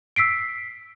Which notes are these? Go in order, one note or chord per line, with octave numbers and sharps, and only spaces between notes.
E6 B6 C7 D7